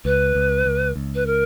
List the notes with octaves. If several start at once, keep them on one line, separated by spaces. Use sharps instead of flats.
C#2 B4
C#2
C#2
C#2
B4
A#4